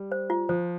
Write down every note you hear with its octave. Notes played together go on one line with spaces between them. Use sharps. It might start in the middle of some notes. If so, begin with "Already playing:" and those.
Already playing: G3
C5
F4
F3 C5